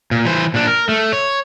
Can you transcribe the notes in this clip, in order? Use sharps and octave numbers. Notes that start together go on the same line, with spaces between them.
A#2
E3 C5
A#2 D4
A#4
A3
C#5